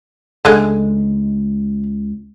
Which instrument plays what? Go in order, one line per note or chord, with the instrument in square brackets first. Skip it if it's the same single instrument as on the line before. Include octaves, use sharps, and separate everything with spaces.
[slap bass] C#2 [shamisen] D3 G#3 A3